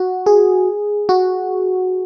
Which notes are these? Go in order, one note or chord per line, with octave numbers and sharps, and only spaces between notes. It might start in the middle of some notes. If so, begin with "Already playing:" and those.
Already playing: F#4
G#4
F#4